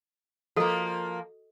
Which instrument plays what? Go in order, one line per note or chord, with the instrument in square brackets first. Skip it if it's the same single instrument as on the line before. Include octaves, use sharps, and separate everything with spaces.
[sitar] F3 A#3 [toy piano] F#4 A4 D#5